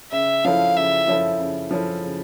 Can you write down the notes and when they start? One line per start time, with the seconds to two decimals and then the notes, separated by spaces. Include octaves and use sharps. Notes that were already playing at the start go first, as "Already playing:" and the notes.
0.12 C#3 E5
0.44 F3 C#4 E4 A4 F5
0.76 C#3 E5
1.08 F3 C#4 E4 A4
1.39 C#3
1.71 F3 C#4 E4 A4
2.03 C#3